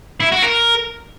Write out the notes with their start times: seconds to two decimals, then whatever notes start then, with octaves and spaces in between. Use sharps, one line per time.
0.20 E4
0.32 F#4
0.44 A#4